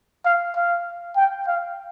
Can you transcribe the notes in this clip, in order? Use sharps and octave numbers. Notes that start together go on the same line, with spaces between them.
F5
F5
G5
F5